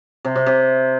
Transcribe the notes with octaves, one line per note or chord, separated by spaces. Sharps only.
C3
C3
C3